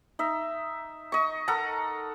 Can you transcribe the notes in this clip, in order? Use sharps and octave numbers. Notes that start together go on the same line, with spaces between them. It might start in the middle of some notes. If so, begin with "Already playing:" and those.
D#4 E5
D#5 C#6
A4 A#4 F#5 A#5